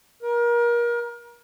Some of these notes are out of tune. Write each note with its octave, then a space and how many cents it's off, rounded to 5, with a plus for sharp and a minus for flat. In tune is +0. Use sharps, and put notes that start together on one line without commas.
A#4 +30